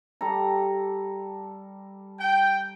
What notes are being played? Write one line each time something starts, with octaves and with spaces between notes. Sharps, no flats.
G3 A4 A#5
G5